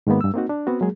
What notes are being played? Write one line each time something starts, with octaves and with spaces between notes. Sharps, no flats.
G#2 D#3 G#3 A#3 B3
G2 E6
A#3 C4 D#4 F#4
D4
B3 C4 F#4
F#3 G#3 A#3 G#4